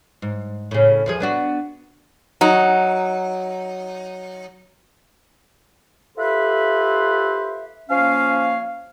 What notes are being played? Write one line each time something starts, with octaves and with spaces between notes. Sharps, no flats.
G#2
A2 C#3
E2 F3 G#4
B3 D4 F#4
F#3 D#4
F4 G4 A4 B4 C5 E5
F3 A#3 C#4 C#5 F5